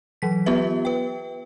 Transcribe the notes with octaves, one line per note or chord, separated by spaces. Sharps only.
E3 F#3 B6
B3 F4 G4 B4 E5
B4 G5